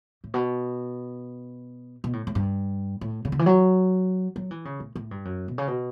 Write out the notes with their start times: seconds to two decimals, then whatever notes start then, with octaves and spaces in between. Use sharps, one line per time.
0.24 A2
0.34 B2
2.04 B2
2.13 A2
2.27 A2
2.35 G2
3.01 A2
3.25 C#3
3.32 D3
3.39 E3
3.46 F#3
4.36 F#3
4.51 E3
4.65 C#3
4.80 A2
4.96 A2
5.11 G2
5.25 F#2
5.48 B2
5.58 C#3
5.67 B2